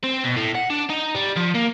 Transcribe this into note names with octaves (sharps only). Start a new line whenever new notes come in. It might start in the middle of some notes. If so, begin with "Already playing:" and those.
C4
B2
A2
F#5
D4
D#4
G3
F3
A#3